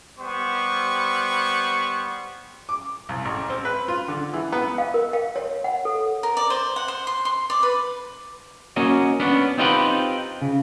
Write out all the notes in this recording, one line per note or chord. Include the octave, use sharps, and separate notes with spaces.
G3 B3 C5 C#6
D6
C2
A1
C4
B4
F4
D3
E3
B3
F5
A#4
F5
C#5
F#5
A4
A#4
D5
C5
F#5
C5
C6
C6
D5
B4
A#3 C#4 F#4 D#5
B3 C#4 D4
C4 D#4 F4 G4 B4
C#3